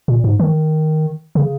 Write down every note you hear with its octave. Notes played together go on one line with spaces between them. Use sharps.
A#2
G#2
D#3
C#3